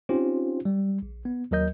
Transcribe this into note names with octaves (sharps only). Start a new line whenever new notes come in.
C4 C#4 D#4 F4 G4 C5
G3
A#1
B3
D#2 F#3 A#4 D#5 G6